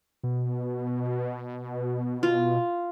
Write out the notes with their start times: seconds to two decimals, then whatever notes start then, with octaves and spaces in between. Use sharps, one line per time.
0.23 B2
2.23 F4